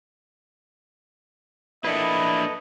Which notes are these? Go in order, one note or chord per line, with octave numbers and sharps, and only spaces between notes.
A#3 D4 E4 A4 B4 D#5